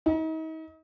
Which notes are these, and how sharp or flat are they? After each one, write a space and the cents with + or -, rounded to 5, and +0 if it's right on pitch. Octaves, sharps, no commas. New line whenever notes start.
D#4 +40